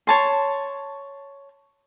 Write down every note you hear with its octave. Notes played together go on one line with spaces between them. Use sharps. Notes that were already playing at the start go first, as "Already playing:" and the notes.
C#5 A5 C6